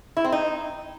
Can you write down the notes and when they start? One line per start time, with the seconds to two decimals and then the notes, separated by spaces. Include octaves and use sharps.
0.17 E4
0.24 C4
0.32 D#4